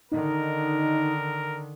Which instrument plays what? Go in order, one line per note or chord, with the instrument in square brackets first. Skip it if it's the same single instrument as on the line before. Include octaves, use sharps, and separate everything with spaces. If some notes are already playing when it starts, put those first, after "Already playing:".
[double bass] D3 D#3 [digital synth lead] D#4 [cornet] A#4